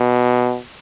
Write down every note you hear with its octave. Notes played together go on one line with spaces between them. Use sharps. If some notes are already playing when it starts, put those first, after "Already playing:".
Already playing: B2